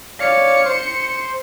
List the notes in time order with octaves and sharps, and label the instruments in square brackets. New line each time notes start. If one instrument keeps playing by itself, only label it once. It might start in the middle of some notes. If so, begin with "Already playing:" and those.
[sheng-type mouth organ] C#5 D5 F5 [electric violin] C#7
[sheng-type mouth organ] C5 C6